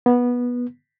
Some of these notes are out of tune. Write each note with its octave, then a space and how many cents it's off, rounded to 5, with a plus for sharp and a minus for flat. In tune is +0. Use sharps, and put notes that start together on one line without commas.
B3 -15